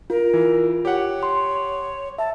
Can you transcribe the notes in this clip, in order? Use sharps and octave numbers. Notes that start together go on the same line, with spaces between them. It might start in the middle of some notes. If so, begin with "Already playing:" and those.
F4 A#4
E3
G4 C#5 F#5
C6
E5 A5